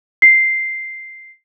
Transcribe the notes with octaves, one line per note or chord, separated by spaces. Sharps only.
C7